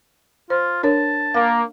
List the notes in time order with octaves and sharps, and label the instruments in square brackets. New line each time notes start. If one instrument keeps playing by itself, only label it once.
[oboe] F4 [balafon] C5
[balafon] D4 A#4 C#5 [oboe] A5
[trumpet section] A#3 [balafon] F5